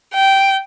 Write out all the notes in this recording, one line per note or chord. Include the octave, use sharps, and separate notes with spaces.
G5